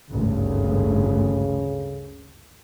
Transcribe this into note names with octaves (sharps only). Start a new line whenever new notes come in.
G#1 D2 G2 C#3